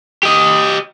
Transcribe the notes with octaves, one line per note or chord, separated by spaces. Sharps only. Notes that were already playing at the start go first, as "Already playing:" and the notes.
G4 D#5